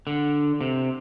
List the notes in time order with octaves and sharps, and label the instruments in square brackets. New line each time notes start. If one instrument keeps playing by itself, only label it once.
[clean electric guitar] D3
C3